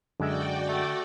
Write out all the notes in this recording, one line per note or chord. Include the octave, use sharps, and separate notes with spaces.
F#2 D3 G#3 F#4 D5 E5 G5
A3